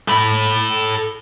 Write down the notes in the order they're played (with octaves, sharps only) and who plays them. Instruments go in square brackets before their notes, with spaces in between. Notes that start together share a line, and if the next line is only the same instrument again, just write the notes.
[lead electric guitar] A4 B5